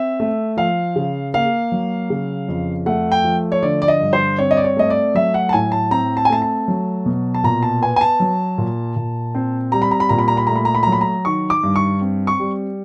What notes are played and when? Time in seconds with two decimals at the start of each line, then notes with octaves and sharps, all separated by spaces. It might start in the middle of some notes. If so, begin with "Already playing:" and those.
Already playing: C4 E5
0.20 A3
0.57 F3 F5
0.96 C#3
1.34 A#3 F5
1.72 F#3
2.10 C#3
2.48 F2
2.86 A3 F#5
3.12 G5
3.25 F3
3.52 C#5
3.63 D3 D5
3.82 D5
3.88 D#5
4.01 G2
4.13 C5
4.38 C4 C#5
4.51 D#5
4.57 D5
4.64 C#5
4.77 A3 D#5
4.90 D5
5.15 F#3 E5
5.34 F#5
5.49 A5
5.53 A2 G#5
5.72 A5
5.91 C4 A#5
6.17 A5
6.25 G#5
6.30 A3 A5
6.42 A5
6.68 F#3
7.06 B2
7.34 A5
7.43 A#2 A#5
7.63 A5
7.82 B3 G#5
7.96 G#5
8.01 A5
8.20 F#3
8.58 A#2
8.96 A#2
9.35 C4
9.72 G3 A#5
9.82 B5
9.91 A#5
10.00 B5
10.09 A#2 A#5
10.18 B5
10.28 A#5
10.37 B5
10.47 A3 A#5
10.56 B5
10.65 A#5
10.75 B5
10.83 F#3 A#5
10.92 B5
11.01 A#5
11.25 D#3 C#6
11.50 D6
11.63 G2
11.76 C#6
12.01 C4
12.27 C#6
12.40 G3